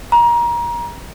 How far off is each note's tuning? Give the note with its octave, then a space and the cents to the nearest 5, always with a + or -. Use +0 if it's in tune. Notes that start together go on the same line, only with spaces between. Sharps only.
A#5 +25